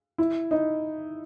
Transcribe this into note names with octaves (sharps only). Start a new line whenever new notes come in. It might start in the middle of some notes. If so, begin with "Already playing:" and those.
E4
D#4